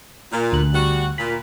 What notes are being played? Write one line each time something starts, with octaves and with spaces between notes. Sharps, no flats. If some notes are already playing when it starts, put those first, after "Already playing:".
A#2
D2 F#6
G3 F#4
A#2 B5